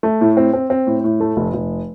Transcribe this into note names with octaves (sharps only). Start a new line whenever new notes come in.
A3
A2
C4
C4
C4
A2
A2
A3
F1
F1